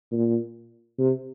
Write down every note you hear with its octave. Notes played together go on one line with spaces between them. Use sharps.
A#2
C3